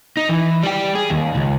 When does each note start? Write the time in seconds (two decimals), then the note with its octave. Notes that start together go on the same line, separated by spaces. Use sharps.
0.17 D#4
0.29 E3
0.63 G3 G5
0.95 G#4
1.10 D#2
1.35 C#2